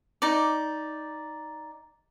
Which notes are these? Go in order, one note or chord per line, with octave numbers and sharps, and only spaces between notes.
D#4 D5